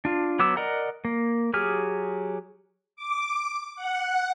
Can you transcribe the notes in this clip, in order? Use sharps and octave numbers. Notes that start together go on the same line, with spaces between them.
D4 F4
F#3 B3 D6 E6
A#4 D5 D#5 F#5 A#5
A#3
F#3 G4 G#4 F6
D6
F#5